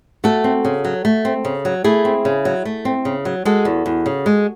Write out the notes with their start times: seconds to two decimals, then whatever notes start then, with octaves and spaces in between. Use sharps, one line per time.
0.24 A3 F#4 A4
0.44 C4
0.65 C#3
0.84 F#3
1.05 A3
1.25 C4
1.45 C#3
1.65 F#3
1.84 A3 E4 G#4
2.05 C4
2.25 C#3
2.45 F#3
2.65 A3
2.85 C4
3.05 C#3
3.25 F#3
3.45 G#3 F#4 A4
3.65 E2
3.86 E2
4.06 C#3
4.26 G#3